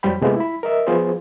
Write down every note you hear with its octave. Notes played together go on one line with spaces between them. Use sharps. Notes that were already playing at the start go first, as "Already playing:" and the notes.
F2 F#3 G3 C5 G5 B5
C3 G#3 A3 B3 F4 G4
E4 B5
A#4 D#5 E5
F3 B3 F4 G#4 C5